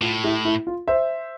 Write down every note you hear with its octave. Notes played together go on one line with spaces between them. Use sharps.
A2 F4
E4 G4
E4
F4
C5 E5